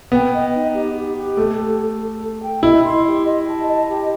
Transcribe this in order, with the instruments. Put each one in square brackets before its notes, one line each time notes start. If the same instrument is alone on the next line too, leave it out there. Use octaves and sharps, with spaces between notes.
[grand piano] B3 [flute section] G5
[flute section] D#5
D#4
G4
G4
G4
[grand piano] A3 [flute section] A4
[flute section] A4
A4
A4
A4
G5
[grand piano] E4 [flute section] D#5
[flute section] C6
G4
D#5
A5
D#5
G4